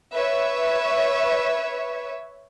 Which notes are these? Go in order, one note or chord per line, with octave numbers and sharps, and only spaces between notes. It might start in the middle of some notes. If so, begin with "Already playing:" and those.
B4 C#5 E5